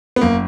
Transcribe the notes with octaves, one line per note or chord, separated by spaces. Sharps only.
B3
F#1 A#3